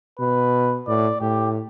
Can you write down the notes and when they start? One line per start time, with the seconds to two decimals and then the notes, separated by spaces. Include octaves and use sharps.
0.19 B2 B4
0.88 A2 D5
1.21 A2 G4